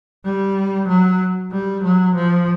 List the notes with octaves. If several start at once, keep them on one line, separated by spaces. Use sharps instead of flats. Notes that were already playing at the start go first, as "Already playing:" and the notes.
G3
F#3
G3
F#3
F3